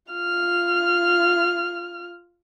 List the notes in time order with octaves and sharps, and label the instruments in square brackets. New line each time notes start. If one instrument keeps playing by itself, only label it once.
[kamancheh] F4 F6